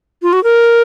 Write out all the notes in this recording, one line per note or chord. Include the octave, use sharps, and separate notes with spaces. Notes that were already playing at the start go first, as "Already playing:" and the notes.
F4
F#4
A#4